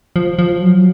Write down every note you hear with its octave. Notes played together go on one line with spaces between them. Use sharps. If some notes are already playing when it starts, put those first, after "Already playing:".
F3
F3
F#3